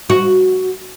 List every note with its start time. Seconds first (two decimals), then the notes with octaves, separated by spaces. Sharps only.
0.10 F#4